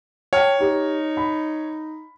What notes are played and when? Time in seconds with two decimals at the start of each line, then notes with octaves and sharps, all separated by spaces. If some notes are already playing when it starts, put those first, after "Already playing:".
0.33 C#5 G5 A5 F6
0.61 D#4 G4
1.17 B5